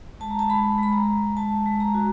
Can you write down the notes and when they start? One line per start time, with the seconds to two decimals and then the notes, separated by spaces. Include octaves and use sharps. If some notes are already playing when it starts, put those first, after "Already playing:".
0.20 G#3 A5
0.30 A#5
0.39 A5
0.50 G#3 B5
0.78 G#3
0.83 B5
0.93 A#5
1.07 G#3
1.37 G#3 A5
1.66 G#3
1.80 A#5
1.94 F#4